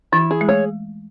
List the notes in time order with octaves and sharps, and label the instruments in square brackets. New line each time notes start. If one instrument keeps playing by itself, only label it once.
[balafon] E3 [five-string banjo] E4
[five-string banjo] G#4
[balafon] G#3
[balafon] A3 [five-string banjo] C#5